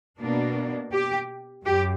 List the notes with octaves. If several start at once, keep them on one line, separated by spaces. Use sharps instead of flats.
B2 A#3 D4
G4
F#2 G4